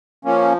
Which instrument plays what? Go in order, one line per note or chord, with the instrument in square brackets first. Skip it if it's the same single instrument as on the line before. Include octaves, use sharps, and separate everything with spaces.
[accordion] F3 A#3 C#4